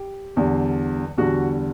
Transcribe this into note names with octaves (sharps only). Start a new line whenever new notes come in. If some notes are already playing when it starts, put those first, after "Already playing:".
Already playing: G4
E2 D3 G3
E2 D3 G3 F#4